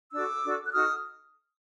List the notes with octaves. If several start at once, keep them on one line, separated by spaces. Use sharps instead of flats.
D4 F#4 A4 D6 E6
D4 F#4 A4
F#6
D#4 F#4 A4 D#6 F6